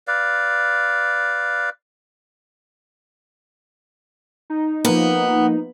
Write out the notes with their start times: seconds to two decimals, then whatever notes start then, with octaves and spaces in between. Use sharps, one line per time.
0.08 B4 D5 F5
4.50 D#4
4.85 F3 A#3 B3